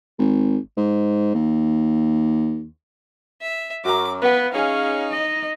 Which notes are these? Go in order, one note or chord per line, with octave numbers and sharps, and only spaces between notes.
G#1
G#2
D#2
E5
F#2 F#4 A#5 D6
B3 B4 F5 F#5
C#4 D#4 G#4 C#5 F5 G#5
D#5